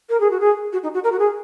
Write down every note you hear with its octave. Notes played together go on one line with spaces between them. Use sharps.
A#4
G#4
F#4
G#4
F#4
D#4
F#4
A#4
F#4
G#4